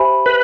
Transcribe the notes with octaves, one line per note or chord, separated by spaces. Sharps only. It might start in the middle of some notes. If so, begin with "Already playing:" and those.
Already playing: G4 C5 E5 G#5 B5
B4